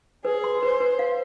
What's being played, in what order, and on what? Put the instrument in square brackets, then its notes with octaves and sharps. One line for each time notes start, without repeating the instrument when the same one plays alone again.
[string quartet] G#4 [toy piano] B4
[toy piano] C6
[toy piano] B4 [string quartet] C5
[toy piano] B4
F5